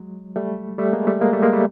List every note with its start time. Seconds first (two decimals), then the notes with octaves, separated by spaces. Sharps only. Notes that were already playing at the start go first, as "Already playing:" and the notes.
Already playing: F#3 G#3
0.36 G3 A3
0.78 G3 A3
0.93 G#3 A#3
1.07 G3 A3
1.21 G#3 A#3
1.33 G3 A3
1.43 G#3 A#3
1.53 G3 A3